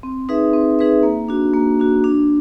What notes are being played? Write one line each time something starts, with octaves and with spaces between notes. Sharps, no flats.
C4
D#4 G#4 B4 E5
C4
D#4 G#4 B4 E5
A#3
D4 F#4
A#3
D4 F#4
D4